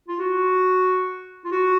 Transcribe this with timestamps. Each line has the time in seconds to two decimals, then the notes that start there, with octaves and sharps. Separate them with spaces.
0.08 F4
0.19 F#4
1.45 F4
1.51 F#4